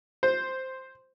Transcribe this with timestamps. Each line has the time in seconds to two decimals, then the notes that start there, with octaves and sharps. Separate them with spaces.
0.23 C5